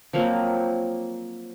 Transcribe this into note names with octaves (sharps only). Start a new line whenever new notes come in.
F3 F#3 A#3 C4